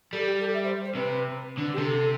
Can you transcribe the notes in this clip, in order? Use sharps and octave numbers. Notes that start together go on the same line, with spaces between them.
G3 A4
G4
A4
E5
C5
C5
C3 B4
D3
G4
C3 A4